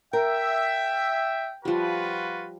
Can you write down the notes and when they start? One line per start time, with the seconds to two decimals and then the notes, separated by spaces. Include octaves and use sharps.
0.13 A#4 E5 G5
1.65 F3 G3 F4 F#4 B4